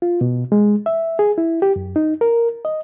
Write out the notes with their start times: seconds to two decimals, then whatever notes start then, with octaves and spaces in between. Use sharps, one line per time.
0.02 F4
0.21 B2
0.52 G#3
0.86 E5
1.19 G#4
1.38 E4
1.62 G4
1.76 F#2
1.96 D#4
2.21 A#4
2.65 D#5